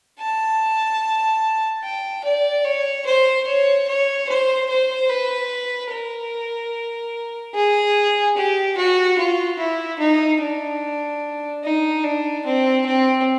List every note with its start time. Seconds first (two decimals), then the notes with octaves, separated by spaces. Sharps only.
0.20 A5
1.83 G5
2.25 D5
2.64 C#5
3.06 C5
3.47 C#5
3.87 C#5
4.28 C5
4.70 C5
5.10 B4
5.92 A#4
7.55 G#4
8.37 G4
8.78 F#4
9.19 F4
9.59 E4
10.00 D#4
10.41 D4
11.64 D#4
12.04 D4
12.45 C4
12.86 C4